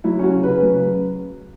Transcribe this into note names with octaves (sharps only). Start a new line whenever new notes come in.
F#3 E4
C#4 F#4
C#3
B4
C#3
F#3